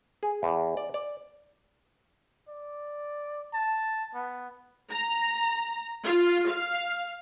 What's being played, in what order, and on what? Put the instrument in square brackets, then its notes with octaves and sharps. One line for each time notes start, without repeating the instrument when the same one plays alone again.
[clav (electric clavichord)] G#4
E2
D5
D5
[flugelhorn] D5
A5
B3
[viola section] A#5
F4
F5